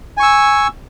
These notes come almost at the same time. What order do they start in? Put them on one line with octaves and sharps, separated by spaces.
G#5 C#6 E6